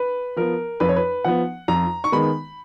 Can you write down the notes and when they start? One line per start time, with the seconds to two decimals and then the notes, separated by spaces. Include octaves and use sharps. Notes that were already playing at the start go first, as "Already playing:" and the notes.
Already playing: B4
0.37 F3 B3 A#4
0.80 F2 B4
0.89 C#5
0.96 B4
1.25 F3 B3 F#5
1.68 F2 A#5
2.04 C#6
2.12 D#3 G#3 B3 B5